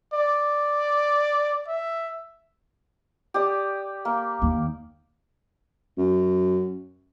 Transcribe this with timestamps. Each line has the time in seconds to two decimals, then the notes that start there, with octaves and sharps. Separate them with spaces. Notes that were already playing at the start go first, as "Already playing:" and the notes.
0.14 D5
1.67 E5
3.34 G4 D5 D#6
4.05 A#3
4.42 D#2
5.98 F#2